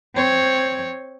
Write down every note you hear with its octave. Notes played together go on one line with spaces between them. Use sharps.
C4 C#5